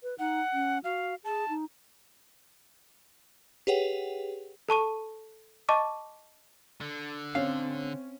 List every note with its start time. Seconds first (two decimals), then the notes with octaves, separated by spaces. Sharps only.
0.03 B4
0.19 D#4 F#5
0.53 C#4
0.84 F#4 F5
1.25 G#4 A5
1.49 D#4
3.67 G4 G#4 B4 C#5 F#5 G5
4.69 A4 A5 C#6 D#7
5.69 D#5 A5 C#6 D6
6.81 D3
7.35 C4 C#4 F5